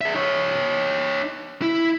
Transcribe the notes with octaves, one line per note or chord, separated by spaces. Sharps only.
G#4 E5
D#4 C#5
E4